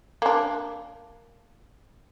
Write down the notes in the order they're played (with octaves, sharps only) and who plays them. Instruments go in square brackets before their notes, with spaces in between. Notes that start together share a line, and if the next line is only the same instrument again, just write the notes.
[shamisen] A#3 D4